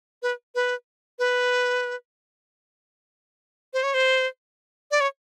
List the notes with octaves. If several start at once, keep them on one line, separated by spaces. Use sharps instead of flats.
B4
B4
B4
C5
C#5
C5
D5
C#5